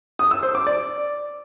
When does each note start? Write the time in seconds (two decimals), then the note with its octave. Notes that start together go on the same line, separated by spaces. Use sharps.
0.19 D#6
0.31 E6
0.43 C5
0.55 D6
0.67 D5